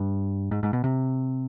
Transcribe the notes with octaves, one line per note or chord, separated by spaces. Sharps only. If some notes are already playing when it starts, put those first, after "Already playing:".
Already playing: G2
G#2
G#2
B2
C3